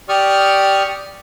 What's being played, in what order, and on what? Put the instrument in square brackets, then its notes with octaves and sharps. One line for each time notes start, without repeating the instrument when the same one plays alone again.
[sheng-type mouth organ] G4 D5 C#6 D#6 F6